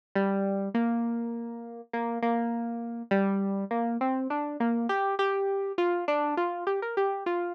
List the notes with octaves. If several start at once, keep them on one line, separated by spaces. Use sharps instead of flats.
G3
A#3
A#3
A#3
G3
A#3
C4
D4
A#3
G4
G4
F4
D4
F4
G4
A#4
G4
F4